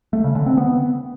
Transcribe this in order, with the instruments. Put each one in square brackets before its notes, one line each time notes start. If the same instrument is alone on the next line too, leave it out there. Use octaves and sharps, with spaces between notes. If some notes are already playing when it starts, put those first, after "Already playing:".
[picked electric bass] A3
C#3
D3
C4
B3